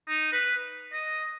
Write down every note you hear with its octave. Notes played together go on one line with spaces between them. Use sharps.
D#4
B4
D#5